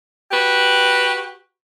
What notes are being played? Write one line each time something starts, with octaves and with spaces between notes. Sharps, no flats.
F#4 G4 B4